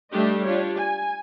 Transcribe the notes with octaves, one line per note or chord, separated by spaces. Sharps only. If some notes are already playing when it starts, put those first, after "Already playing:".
G3 A3 D4 G4 D#5
D4 F4 G4 C#5
G#5